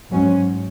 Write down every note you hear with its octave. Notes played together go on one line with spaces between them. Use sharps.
G#2 F#3 C#4